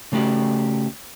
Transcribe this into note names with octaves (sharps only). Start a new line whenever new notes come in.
C#3 A3 F#4 G4